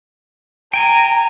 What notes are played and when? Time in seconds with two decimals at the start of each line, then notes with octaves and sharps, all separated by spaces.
0.73 G5 G#5 A#5